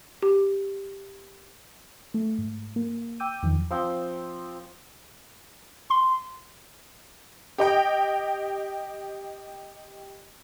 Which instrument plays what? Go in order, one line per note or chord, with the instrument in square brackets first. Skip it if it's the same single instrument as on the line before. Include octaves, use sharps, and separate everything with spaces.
[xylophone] G4
[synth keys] A3
G#2
A#3
G5 D6 E6 G6 D#7
E2 D#3 F3
[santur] F3 C4 G5
[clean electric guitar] C6
[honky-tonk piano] G4 D#5 G5